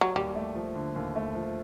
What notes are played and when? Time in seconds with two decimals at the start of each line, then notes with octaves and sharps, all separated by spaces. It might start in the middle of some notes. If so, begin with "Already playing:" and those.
0.01 F#3
0.15 D#2 G3
0.36 A3
0.55 F3
0.75 D3
0.96 D#2
1.16 A3
1.35 F3